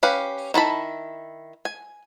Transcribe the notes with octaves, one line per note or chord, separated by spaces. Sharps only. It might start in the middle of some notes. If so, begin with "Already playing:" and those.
C#4 G4 B4 F5
D#3 E4 A5 B5
G#5